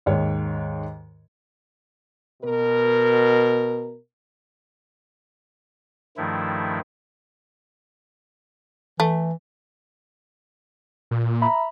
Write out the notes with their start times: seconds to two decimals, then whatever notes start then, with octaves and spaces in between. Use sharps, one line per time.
0.06 D#2 G#2 C#5
2.43 B2 A#4
6.17 G2 D#3 F3 A3 E4
9.00 E3 A3
11.11 A#2
11.42 E5 A#5 B5